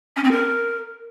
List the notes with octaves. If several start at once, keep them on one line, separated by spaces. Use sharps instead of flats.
C#4
C4
A#4